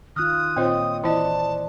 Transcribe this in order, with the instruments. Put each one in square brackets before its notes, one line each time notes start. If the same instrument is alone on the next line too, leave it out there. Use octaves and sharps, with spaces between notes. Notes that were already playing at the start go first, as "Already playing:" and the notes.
[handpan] D#3 F4 [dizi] D#6 [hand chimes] F6 F#6
[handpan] A#2 [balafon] C4 F4 C5 [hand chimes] C#5 D#5 G5
[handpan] E3 [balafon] E4 D#5 [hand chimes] C5 D5 [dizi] A5